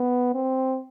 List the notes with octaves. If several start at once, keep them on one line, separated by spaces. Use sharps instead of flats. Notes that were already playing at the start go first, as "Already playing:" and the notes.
Already playing: B3
C4